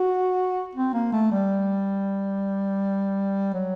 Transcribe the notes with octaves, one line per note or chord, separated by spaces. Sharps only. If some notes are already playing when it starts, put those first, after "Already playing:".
Already playing: F#4
C4
A#3
A3
G3
F#3